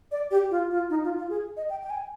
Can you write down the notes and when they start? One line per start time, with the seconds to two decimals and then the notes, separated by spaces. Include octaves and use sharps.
0.12 D5
0.31 G4
0.51 F4
0.71 F4
0.90 D#4
1.04 F4
1.18 F4
1.30 G#4
1.57 D#5
1.70 G5
1.83 G5
1.90 G#5